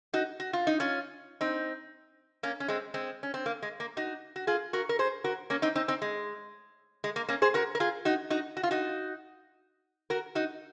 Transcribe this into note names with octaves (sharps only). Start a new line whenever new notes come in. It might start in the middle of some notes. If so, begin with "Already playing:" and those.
D#4 F#4
F#4
F4
D#4
C#4 F4
C4 D#4
A#3 C#4
C#4
G#3 C4
G#3 C4
C#4
C4
A#3
G#3
A#3
D#4 F#4
F#4
F4 G#4
F#4 A#4
A#4
G#4 C5
F#4 A#4
A#3 C#4
C4 D#4
C4 D#4
C4 D#4
G#3
G#3
A#3
A#3 C#4
G#4 C5
F#4 A#4
A#4
F4 G#4
D#4 F#4
D#4 F#4
F#4
F4
D#4 F#4
F#4 A#4
D#4 F#4